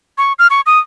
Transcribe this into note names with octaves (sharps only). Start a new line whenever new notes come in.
C#6
F6
C#6
D#6